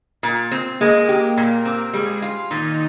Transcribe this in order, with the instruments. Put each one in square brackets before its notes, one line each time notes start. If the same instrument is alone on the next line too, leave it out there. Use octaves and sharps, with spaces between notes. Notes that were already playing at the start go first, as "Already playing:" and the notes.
[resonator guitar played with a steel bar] A#2
C4
[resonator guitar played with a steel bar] G#3 [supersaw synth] A#3 A#4
[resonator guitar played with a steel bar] G4
A#2
C4
[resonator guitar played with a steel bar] G3 [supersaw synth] G#3 G#4
[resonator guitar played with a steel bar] F4
[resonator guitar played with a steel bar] A#2 [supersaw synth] D#3 D#4